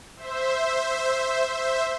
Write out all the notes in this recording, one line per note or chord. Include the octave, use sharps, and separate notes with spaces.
C5 E5
C5 E5